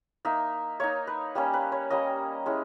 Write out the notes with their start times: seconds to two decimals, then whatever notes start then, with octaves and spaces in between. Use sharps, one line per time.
0.25 A#3 D#4 E5
0.80 A#3 D#4 C#5
1.07 B4
1.35 G3 A#3 C#4
1.54 B4
1.72 C#5
1.90 G3 A#3 C#4 D#5
2.46 G#3 C#4 E4